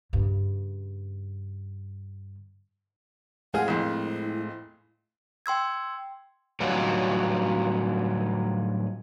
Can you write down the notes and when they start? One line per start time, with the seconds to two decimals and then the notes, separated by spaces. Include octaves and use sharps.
0.13 G2 C#3
3.54 A2 G#3 C4 F4 G#4 F#5
3.68 A#1 F2 E4
5.46 G5 C6 E6 G#6
6.60 A2 F#3 G3 C#4 D#4 F4